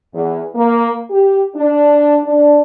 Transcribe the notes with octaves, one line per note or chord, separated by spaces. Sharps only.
E2
A#3
G4
D4
D4